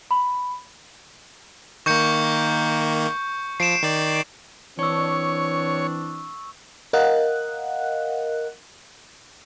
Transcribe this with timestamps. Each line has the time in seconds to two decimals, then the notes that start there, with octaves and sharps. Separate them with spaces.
0.11 B5
1.86 D#3 A#3 C#6 G6 C#7
3.60 F3 C7 D7 E7
3.83 D#3 D5
4.79 E3 C4 D4 C#5 C#6 E6
6.93 A#4 D#5 F5 F#5 F#6